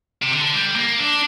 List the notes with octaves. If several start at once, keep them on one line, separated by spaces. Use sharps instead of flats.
C3
D3
G3
A#3
D4